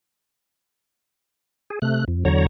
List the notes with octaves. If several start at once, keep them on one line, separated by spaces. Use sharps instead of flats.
G#4
C3 A3 F#6
F2
E2 D3 F#3 C#5 A#5